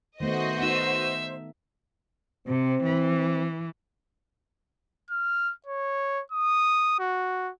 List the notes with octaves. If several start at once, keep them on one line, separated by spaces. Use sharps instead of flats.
D#3 A3 B3 F#4 C5 D#5
B3 D#4 E5 E6
C3 C4
E3
F6
C#5
D#6
F#4